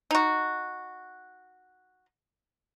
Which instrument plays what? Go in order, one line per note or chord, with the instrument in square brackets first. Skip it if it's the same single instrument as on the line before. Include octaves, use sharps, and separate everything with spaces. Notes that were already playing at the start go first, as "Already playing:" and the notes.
[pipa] D#4 F#4